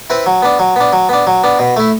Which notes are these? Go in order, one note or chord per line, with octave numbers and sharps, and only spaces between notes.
C4 E4 B4
F#3
B3 D4
F#3
B3 D4
F#3
B3 D4
F#3
B3 D4
B2
A3 E4